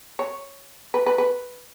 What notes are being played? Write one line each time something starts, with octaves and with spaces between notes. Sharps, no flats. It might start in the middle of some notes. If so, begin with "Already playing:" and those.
C#5
B4
B4
B4